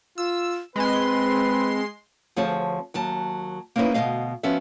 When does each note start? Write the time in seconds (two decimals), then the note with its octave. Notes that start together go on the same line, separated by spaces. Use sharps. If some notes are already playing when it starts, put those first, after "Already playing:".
0.18 F4 E6
0.76 G#3 C4 B4 C6
2.36 D2 F3 C4 G#4 C#5 A5
2.94 D#2 F#3 A5
3.76 A#3 C4 C#4 D#4 E4 B4
3.94 D2 B2 E3 A3 D#5 F5
4.43 F3 B3 C#4 F#4 E5